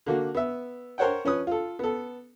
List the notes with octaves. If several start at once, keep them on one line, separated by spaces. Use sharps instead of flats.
D3 A#3 F#4
B3 E5
A#4 C5 C#5 F#5 G5
F3 C#4 B4 D#6
F4 A4
B3 A4